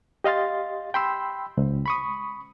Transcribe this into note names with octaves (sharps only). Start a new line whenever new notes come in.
G4 D#5 F5 C6 A6
G5 B5 C6 E6
C#2
B5 C#6 D#6